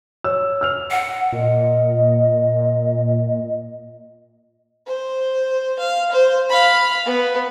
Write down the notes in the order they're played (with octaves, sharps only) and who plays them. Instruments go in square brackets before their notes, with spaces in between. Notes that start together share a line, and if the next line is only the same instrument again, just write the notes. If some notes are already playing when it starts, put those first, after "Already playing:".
[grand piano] C#5 E6
E6 F6 F7
[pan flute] F#5
[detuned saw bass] A#2 [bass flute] D#5
[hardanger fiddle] C5
F5
C5
F5 B5
B3